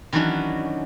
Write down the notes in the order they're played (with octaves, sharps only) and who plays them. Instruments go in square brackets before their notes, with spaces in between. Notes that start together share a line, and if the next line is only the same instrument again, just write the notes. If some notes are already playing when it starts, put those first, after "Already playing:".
[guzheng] D#3 E3 F#3 C#4 D4 F#4